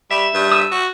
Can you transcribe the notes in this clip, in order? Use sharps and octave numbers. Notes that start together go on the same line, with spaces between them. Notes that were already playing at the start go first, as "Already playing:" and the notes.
G3 E5
G2
D#6 E6
F#4